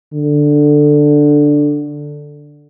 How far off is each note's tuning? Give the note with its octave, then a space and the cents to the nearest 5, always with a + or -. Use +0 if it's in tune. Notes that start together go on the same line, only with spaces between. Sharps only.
D3 +5